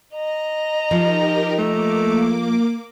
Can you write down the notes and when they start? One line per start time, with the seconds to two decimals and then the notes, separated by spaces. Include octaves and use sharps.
0.15 D#5 A#5
0.91 F3 D#4 G4 A#4
1.59 A3 A#3 D6